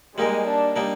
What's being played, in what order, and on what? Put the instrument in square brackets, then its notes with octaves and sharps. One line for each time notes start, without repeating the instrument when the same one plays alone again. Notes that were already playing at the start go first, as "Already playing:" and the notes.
[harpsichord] G3 A#3 D#4 A#4 [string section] G#3
[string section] D4
[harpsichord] G3 A#3 D#4 A#4